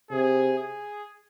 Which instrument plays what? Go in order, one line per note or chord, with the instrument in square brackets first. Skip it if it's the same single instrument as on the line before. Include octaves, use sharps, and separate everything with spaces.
[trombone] C3 [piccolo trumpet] G#4
[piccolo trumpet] G#4